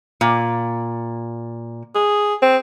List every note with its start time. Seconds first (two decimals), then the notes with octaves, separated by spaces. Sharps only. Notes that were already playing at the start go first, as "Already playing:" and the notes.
0.21 A#2
1.95 G#4
2.42 C4